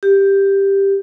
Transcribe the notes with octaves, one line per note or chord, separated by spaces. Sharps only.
G4